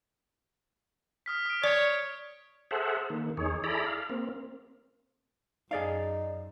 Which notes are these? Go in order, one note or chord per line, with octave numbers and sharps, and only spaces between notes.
D#6 F6 B6
D#6 B6 D7
C#5 D5
G#4 A4 C5 E5 F#5
D#3 A#3
E2 D#4 G#4 C#5
E4 G#4 A4 D5 A#5 B5
F5
A#3 C4
F#2 D#4 G#4 D5 F5